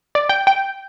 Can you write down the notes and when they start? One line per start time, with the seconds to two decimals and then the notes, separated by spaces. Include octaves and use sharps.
0.15 D5
0.29 G5
0.47 G5